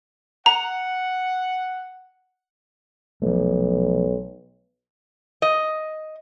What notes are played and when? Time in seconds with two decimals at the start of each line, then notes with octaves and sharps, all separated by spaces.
0.46 F#5 A#5
3.22 B1 F3 A3
5.42 D#5